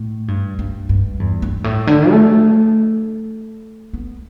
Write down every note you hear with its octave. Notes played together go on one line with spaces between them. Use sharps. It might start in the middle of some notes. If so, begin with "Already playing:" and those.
Already playing: A2
G2
G2
G2
E2
G2
A2
D3
A3
B3